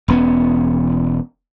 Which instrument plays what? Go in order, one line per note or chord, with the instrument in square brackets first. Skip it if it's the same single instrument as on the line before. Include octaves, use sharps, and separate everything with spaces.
[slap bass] E1 E2 B3 C#4